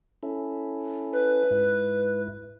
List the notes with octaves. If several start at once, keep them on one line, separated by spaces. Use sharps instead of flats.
C#4 E4 A4
B4
G#2 E4